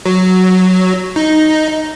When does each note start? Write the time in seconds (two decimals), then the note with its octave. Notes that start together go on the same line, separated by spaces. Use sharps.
0.06 F#3
1.16 D#4